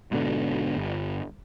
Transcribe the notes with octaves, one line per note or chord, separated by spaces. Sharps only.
G#2 B2 D3
G1